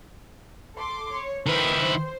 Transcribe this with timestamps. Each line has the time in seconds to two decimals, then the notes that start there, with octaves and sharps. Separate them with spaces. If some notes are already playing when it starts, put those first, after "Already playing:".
0.75 A4 C6 D6
1.12 C#5
1.47 D#3 E4 B4 C5 G5
1.76 C5